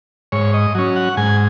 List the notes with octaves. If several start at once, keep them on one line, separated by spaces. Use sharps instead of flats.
G#2 C#5
D#5
F#3 C#4
F#5
G#2 G#5